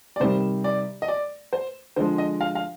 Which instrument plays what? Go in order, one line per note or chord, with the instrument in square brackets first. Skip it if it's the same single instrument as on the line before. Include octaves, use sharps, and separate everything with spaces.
[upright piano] D5
C3 D#3 G3 C5
D5
D#5
D5
C5
D3 F3 G#3 C5
D#5
F5
F5